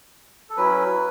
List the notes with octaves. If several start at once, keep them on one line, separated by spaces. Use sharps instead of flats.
A4
F#3 C#4 E4 B4